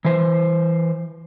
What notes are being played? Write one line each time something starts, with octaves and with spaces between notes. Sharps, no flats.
E3 C5